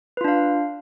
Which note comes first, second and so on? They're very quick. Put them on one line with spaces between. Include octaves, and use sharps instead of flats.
B4 F4 D4 F5